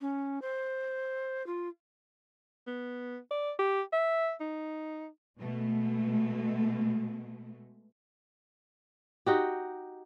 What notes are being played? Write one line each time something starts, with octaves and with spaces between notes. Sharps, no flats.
C#4
C5
F4
B3
D5
G4
E5
D#4
B2 G#3 A3
D#4 F#4 G4